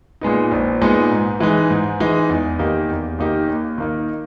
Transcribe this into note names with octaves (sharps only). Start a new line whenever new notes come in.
A#2 G#3 B3 D#4
A#1
A#2 G#3 B3 D#4
G#2
E3 G#3 D#4
G#2
E3 G#3 D#4
E2
D#3 A#3 D#4 G4
E2
D#3 A#3 D#4 G4
D#2
D#3 A#3 D#4